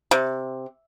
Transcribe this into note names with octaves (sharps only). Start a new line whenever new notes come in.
C3